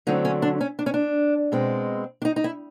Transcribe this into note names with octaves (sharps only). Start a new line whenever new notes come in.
D3 F#3 A3 C4 D#4
C#4
D4
C#4
D4
C#4
D4
B2 G#3 C4
D4
D#4
D#4
E4